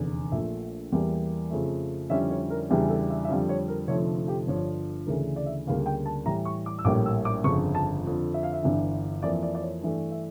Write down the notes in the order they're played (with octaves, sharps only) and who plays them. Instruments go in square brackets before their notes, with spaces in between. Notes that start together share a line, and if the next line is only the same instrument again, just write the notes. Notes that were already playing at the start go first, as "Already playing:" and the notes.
Already playing: [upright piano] F1 E2 D3
A#1 A#2 F3 A3 E5
E2 E3 G3 A#3
F2 C#3 F3 A3
F2 D3 G3 C#4 E4 E5
C#5
A#4
E2 C#3 E3 G3 D4 G4
A4
E5
E5
F2 D3 G3 F5
C#5
A#4
F1 F2 D3 F3 A3 C#5
G4
G1 G2 D3 F3 C#5
D2 C#3 E3 A3 D4 A#4
D5
E5
D2 C#3 G3 A#3 D4 F5
G5
A5
A2 E3 G3 A#5
C#6
D6
E6
A#1 A2 G3 A#3 D6
E6
D6
G1 F2 C#3 C#6
A5
F2 D3 F3
E5
F5
E5
G1 G2 E3
F2 E3 A#3 D5
D5
D5
C#5
G2 E3 A3 D4
E5